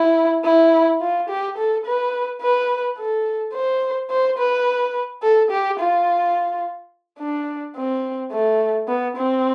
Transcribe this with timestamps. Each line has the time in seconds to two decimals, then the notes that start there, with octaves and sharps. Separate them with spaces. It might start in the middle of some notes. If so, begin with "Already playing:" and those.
Already playing: E4
0.44 E4
1.01 F4
1.29 G4
1.58 A4
1.86 B4
2.42 B4
2.98 A4
3.53 C5
4.10 C5
4.38 B4
5.22 A4
5.51 G4
5.79 F4
7.19 D4
7.76 C4
8.32 A3
8.88 B3
9.16 C4